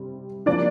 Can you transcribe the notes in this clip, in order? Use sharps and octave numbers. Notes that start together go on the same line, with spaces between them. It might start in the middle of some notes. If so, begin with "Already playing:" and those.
Already playing: C3 G3 C4
F3 A#3 D4 D5